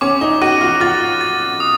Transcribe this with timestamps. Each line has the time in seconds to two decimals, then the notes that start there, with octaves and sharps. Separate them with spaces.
0.01 C#4 D6
0.21 D#4
0.42 F#4 D#7
0.61 F4
0.80 F4 A6
1.21 A6
1.60 D#6